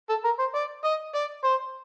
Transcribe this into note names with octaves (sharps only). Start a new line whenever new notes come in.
A4
A#4
C5
D5
D#5
D5
C5